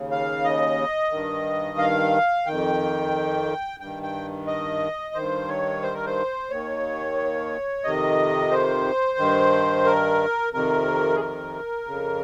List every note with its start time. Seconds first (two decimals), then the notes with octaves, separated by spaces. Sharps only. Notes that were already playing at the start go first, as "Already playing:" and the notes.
Already playing: D#2 C#3
0.11 F5
0.44 D#5
1.11 G2 D#3
1.78 F5
2.46 F2 D#3 G5
3.80 G2 D#3 G5
4.03 G5
4.47 D#5
5.14 G2 D#3 C5
5.48 C#5
5.82 C5
5.94 A#4
6.06 C5
6.50 D#2 D#3 C#5
7.84 F2 C3 D#3 D#5
8.51 C5
9.18 G2 D#3
9.86 A#4
10.53 F2 C3 D#3 A#4
11.16 G#4
11.20 A#4
11.87 F2 C#3